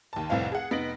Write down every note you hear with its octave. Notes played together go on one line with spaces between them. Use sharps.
D#2 A5
F1 C2 A2 C4 F5
G#4 F#5
F1 B3 D#4 A#6 D7 F#7